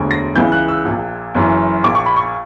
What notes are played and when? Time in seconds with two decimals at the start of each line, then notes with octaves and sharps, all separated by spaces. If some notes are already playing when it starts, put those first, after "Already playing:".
Already playing: E1 D2 D3
0.11 A#6
0.35 C#2 C#3 E3 G6
0.52 F#6
0.68 E6
0.85 A#1 A#2
1.35 F#1 F#2 E3
1.83 A#1 A#2 D6
1.95 C#6
2.06 B5
2.16 C#6